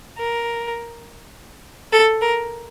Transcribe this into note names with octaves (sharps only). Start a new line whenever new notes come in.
A#4
A4
A#4